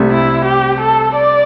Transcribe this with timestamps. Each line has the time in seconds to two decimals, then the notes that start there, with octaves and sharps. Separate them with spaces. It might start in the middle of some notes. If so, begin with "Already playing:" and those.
Already playing: C2 C3 A3
0.11 E4
0.45 G4
0.80 A4
1.15 D5